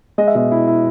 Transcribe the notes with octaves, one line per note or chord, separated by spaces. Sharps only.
G#3 D#5
E5
B2 D#5
E4
E4